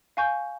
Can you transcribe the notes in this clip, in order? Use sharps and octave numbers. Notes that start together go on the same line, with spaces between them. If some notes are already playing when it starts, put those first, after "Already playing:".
F5 G#5 C#6 G6